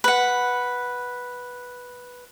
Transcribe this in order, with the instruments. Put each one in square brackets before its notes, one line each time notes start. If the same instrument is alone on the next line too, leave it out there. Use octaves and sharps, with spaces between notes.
[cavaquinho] B4 F#5